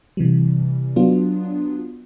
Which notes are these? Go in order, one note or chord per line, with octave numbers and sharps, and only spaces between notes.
C3 E3 G3
F#3 B3 D4 F4